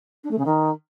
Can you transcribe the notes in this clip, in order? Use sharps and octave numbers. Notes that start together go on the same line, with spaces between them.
D4
A3
C#3
D#3